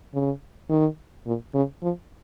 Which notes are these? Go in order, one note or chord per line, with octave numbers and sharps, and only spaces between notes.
C#3
D#3
A#2
C#3
F3